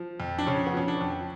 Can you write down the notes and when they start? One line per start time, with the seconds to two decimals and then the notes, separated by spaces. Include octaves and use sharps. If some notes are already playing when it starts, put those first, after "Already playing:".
Already playing: F3
0.20 F2
0.39 D4
0.46 C#3 C#4
0.67 B3
0.74 F3 C#4
0.88 D4
1.01 F2